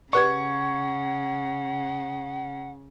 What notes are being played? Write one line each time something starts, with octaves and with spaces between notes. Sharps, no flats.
C#3 G4 B4 D5 F#5 C#6 G#6